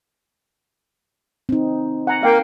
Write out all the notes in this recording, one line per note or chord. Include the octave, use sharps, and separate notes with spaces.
C4 D#4
F#5 G#5 A#5
A#3 F5 G5